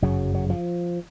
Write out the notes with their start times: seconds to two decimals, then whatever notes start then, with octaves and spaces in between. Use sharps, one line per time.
0.02 G1 F#2 C#3 F#3
0.35 F#3
0.50 F3